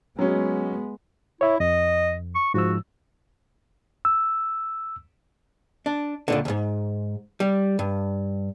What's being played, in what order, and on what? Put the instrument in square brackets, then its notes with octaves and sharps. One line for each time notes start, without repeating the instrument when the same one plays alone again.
[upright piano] F#3 C#4 [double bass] G#3 B3
[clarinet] E4 [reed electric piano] C#5 E5
[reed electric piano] F2 [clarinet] D#5
[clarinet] C#6
[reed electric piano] G#2 F3 E6 [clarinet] F#4
[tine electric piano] E6
[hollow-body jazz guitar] D4
C#2 A#2 D3
D2 G#2
G3
G2